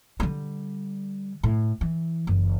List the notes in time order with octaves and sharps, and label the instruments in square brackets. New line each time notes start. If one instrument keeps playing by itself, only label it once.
[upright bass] D3 G3
A2
E3
F#1 E3